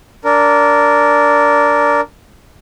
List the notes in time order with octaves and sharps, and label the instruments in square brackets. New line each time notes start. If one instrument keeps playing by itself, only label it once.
[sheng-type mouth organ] D4 A#4